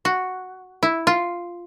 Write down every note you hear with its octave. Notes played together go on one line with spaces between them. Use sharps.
F#4
E4
F4